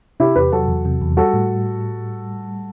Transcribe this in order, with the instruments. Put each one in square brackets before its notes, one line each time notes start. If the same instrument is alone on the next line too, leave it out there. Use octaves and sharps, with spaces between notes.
[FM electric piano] C3 [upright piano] E4 G4
[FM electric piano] E2 [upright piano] G4 B4
[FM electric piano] F#3 [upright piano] F#4 A4
[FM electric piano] E2
C3
E2
[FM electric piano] G3 [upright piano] F#4 A4
[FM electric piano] A2